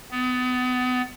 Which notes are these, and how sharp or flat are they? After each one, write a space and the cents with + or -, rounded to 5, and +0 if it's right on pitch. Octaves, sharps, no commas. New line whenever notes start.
B3 +30